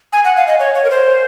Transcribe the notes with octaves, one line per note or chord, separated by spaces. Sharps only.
G#5
F#5
F5
D#5
C#5
C#5
A#4
C5